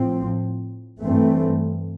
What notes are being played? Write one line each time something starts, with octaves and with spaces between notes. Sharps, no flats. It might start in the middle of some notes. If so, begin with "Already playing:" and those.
Already playing: A2 F3 C4
G2 E3 A3 C4